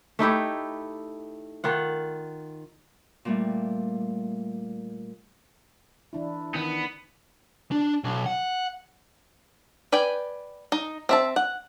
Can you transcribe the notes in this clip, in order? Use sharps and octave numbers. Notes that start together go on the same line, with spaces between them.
A3 D#4 E4 G4
D#3 F4 F#5
A#2 G3 A3
E3 D4 E4
D#3 B3
D4
B1
F#5
B4 D5 G5 G#5
D#4
C4 E5 A5
F#5